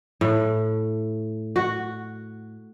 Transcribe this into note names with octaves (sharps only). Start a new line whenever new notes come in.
A2
F#4